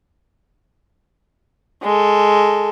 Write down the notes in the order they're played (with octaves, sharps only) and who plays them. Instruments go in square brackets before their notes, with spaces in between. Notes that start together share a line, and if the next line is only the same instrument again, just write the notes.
[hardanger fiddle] G#3 A4